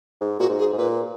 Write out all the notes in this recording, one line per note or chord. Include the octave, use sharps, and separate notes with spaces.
G#2
A#2 F#4
G#2
G#4
G#2
A#2 B4